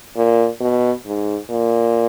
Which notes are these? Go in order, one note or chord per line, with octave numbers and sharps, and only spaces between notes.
A#2
B2
G#2
A#2